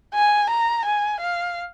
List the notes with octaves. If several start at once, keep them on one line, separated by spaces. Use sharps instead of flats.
G#5
A#5
G#5
F5